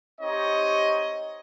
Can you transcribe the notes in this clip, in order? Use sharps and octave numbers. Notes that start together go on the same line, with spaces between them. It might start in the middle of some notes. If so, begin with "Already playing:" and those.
C4 D#4 G4 C#5 D#5